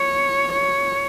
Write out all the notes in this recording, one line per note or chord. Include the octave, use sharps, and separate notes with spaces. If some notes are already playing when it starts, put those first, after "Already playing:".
Already playing: C#5
C#5